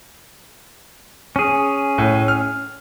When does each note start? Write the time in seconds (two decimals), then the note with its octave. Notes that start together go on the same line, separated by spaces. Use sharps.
1.36 C#4 G#4
1.98 A2
2.28 F6